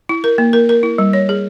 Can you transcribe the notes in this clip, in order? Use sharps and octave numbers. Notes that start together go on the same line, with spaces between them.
E4
A#4
A#3
A#4
A#4
E4
G3
C#5
G#4